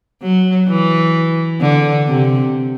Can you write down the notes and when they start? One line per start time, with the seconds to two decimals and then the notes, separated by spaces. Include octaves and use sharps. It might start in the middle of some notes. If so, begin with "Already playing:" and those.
0.22 F#3
0.69 E3
1.61 D3
2.07 C3